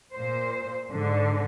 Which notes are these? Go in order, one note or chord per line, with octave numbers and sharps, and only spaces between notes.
A#2 C5
G#2 D3